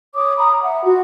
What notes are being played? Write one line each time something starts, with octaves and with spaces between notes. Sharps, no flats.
C#5 D6 D#6
A#5 B5 D#6
A#5
E5 F#5
F4 F#4 F#5